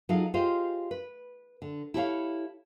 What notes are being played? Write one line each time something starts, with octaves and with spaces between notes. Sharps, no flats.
F#3 D#4 F4 G#4 A4 F5
F4 G4 G#4 C5 D#5 F5
B4
D3
E4 G4 A4 A#4 C#5 F5